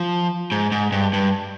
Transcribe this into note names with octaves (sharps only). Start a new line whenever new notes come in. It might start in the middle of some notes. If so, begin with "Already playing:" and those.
Already playing: F3
G#2
G#2
G2
G2